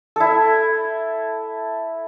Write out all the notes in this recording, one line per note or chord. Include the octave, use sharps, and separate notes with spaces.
E4 A4